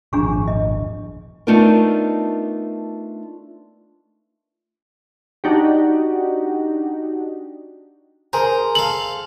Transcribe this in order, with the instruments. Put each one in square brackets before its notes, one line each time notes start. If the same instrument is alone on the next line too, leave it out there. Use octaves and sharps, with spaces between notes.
[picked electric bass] D#1 G#1 F3 [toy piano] D4 G#4 C#6
[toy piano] D#5
[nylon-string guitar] A3 B3 D4 D#4 F4 A#4
[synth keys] D4 D#4 F#4 G4
[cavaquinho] G#4 C5 [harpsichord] A#4
[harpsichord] A4 F5 [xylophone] F#7